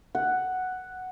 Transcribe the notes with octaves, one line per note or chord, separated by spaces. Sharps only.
F#5